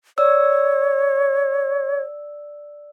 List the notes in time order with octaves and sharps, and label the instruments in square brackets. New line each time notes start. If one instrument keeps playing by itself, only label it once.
[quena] C#5 [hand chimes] D5 E6